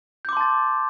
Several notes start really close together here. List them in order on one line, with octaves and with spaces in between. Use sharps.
G6 D6 C6 A5 A6